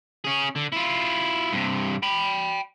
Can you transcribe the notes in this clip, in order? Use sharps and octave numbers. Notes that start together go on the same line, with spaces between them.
C#4 G#4
D3
E4 F4
G2 C3
G5 B5